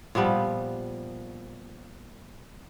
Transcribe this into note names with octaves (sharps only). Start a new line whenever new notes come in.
A#2 F3 G3 B3